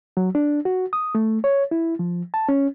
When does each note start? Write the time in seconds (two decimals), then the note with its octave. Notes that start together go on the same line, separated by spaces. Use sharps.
0.17 F#3
0.35 D4
0.65 F#4
0.93 D#6
1.15 A3
1.44 C#5
1.71 E4
1.99 F3
2.34 A5
2.49 C#4